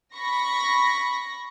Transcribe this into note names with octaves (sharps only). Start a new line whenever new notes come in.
B5 C#6 A#6